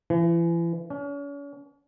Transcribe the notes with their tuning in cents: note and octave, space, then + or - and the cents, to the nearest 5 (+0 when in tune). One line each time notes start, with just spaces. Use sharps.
E3 +35
C#4 +40